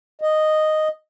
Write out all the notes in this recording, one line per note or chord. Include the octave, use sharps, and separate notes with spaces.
D#5